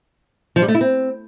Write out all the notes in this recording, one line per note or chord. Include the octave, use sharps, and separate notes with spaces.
F3
G3
A3
E4
C4